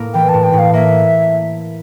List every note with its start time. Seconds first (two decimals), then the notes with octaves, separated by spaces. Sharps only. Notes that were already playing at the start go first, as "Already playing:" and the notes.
Already playing: A2 A#3
0.14 E3 G5
0.29 A2 A5
0.44 G5
0.53 A2
0.58 F5
0.73 A#3 E5